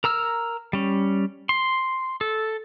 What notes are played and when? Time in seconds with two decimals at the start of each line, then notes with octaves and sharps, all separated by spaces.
0.04 A#4 A#5 E6 F6
0.73 G3 C#4
1.49 C6
2.21 A4